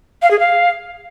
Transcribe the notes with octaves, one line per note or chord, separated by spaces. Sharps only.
F5
G#4
F5